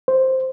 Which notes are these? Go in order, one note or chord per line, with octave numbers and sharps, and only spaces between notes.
C5